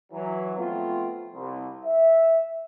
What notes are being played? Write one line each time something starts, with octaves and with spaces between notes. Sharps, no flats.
E3 F#3
F3 A3 B3 C4 F4
C2
E5